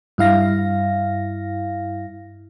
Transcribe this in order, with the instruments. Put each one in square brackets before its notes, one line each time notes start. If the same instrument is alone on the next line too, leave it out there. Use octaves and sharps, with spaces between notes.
[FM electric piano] G2 E4 F5 A#6